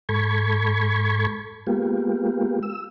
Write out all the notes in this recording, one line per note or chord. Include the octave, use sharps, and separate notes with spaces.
G#2 A4 B5 C#6 G#6
G#3 A#3 B3 F4 G4
E6